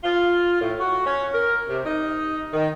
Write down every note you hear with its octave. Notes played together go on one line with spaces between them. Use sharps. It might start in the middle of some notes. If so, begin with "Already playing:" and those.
F4
A2
F#4
C#4
A#4
C3
D#4
D#3